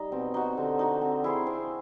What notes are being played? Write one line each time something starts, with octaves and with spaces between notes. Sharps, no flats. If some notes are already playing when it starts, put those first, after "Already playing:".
Already playing: G3 D#4
B2 C4
D#4 F#4
D3 C4
D#4 F#4
C4
E4 G#4 C5
C4